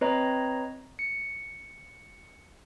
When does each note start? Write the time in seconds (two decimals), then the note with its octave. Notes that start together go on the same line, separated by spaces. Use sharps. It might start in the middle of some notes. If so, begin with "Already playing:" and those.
0.01 C4 B4 C#5 D#5 A#5
0.99 C#7